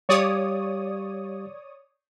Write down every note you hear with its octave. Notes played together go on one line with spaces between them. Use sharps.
G3 G4 C#5 D5 F5 D#6